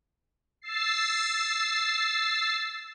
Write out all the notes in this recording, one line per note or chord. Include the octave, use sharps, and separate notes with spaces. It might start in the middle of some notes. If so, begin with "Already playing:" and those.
E6 A6 C7